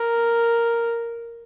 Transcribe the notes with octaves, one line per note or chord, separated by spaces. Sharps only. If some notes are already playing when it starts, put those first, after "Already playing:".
Already playing: A#4